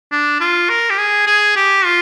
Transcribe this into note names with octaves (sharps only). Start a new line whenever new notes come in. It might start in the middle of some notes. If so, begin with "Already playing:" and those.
D4
F4
A#4
G4
G#4
G#4
G4
F4